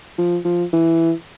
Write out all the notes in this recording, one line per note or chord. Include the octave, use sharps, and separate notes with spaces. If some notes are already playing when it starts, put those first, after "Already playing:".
F3
F3
E3